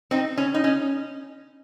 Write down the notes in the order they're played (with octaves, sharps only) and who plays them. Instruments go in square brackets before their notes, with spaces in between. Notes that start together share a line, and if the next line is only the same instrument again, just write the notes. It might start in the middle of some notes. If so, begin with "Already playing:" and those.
[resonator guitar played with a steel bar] C4 D#4
C#4
D#4
C#4